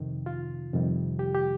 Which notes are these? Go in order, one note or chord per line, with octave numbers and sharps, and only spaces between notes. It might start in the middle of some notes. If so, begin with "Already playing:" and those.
Already playing: F2 C3 D#3
F4
F2 C3 D#3 G3
G4
G4